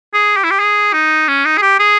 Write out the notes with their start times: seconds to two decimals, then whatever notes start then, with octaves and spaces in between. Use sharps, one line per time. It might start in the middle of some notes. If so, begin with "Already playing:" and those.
0.14 G#4
0.37 G4
0.44 E4
0.51 G4
0.60 G#4
0.93 D#4
1.28 C#4
1.45 D#4
1.58 G#4
1.62 G4
1.80 G#4